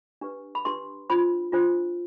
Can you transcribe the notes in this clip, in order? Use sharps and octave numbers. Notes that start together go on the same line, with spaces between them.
D4 G4 B4
B5
D4 G4 B4 C6
D4 F4 C5 B5
D4 F4 C5